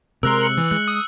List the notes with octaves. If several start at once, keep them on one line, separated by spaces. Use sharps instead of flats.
C3 G#3 A#4 A#5 C6 E6 F#6
C#7 F#7
E3
G#3 F#6
D#6